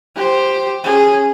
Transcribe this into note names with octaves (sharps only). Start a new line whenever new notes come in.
G4 C5
C#4 G#4